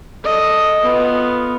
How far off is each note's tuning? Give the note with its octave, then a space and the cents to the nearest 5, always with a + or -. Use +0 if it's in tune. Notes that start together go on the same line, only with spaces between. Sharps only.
A4 +0 D#5 +0
B3 +0 F4 +5